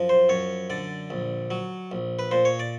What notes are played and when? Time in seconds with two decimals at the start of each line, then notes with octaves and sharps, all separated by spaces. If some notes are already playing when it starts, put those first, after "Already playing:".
Already playing: F#2 F3
0.09 C5
0.29 F#2 C#5
0.70 D3 D5
1.10 A#1
1.50 F#3
1.92 A#1
2.19 B4
2.31 A#2 C5
2.45 C#5
2.59 D5